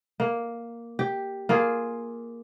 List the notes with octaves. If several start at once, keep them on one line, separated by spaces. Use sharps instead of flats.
A#3
G4
A#3 F4 G#4